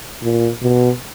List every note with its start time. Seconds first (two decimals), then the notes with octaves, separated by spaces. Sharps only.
0.23 A#2
0.62 B2